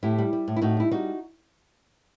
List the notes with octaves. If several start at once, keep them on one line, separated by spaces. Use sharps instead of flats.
A2 E4 G4
G3
G3
A2
E4
A2 D#4 F#4
G3 E4
G3 D#4 F#4